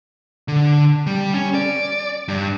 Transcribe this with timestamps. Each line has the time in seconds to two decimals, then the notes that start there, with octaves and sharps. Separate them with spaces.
0.48 D3
1.07 G3
1.34 C#4
1.55 D5
2.28 G2